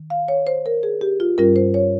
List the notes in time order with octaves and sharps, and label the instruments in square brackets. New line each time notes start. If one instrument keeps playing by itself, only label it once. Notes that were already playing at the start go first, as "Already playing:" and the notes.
Already playing: [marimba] D#3
F5
C#5
C5
A#4
G#4
G4
F4
G2 G3 C#4 F4 A#4
C5
C#5